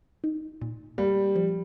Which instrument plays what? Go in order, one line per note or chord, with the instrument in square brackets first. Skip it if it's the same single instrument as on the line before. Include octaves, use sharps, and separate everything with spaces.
[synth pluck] D#4
A#2
[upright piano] G3 [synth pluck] A#3
[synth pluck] F3